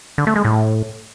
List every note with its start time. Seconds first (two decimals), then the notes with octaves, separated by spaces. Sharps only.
0.18 D3
0.27 A3
0.36 G#3
0.45 A2